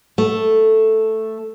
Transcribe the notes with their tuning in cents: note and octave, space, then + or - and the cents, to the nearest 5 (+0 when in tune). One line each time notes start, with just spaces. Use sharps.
A3 +0